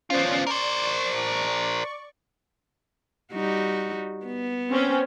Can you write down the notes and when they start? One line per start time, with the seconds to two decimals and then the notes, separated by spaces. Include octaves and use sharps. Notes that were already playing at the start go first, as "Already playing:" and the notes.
0.10 B3 C#4 F4 C5 D5
0.47 A#4 C5 D5 C#6
3.33 G3 D#4 F#4
4.26 B3
4.70 C4 C#4